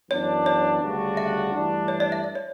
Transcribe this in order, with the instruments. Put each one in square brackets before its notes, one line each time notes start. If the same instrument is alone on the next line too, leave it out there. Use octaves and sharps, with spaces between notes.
[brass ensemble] F#2 E3 B3 D4 [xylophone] C#5
[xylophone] C#5
[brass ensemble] D2 C#3 G3 D4 F#4
[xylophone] E5
[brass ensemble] G2 E3 A3 D4
[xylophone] C#5
D5
E5
D5
C#5